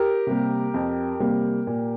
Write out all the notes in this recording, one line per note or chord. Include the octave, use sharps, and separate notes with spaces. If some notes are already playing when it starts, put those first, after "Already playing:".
Already playing: G4 A#4
C3 G3 A#3
F2
C3 G3 A#3
A#2